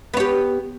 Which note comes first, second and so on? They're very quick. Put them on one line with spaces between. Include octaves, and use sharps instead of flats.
B3 C#5 G4